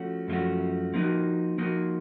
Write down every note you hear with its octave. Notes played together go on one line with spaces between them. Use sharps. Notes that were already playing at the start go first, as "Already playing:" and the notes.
Already playing: F3 A3 C#4 F#4
F#2 F3 A3 C#4 F#4
F3 A#3 D#4 F#4
F3 A#3 D#4 F#4